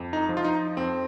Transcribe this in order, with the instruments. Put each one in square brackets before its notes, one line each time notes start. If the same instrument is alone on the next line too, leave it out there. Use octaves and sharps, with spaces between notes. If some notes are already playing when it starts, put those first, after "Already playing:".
Already playing: [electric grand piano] F2
D#4
F3
F4
D#4
F2 C4